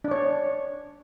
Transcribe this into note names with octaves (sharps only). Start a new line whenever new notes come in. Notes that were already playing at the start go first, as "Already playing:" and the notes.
D4 C#5 D5